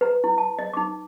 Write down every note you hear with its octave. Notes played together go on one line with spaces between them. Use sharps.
B4 A#5
E4
A5
D#5
D#4 D6